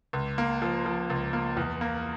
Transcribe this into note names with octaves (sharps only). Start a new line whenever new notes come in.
C#2
A#3
F3
F3
C#2
A#3
E2
A#3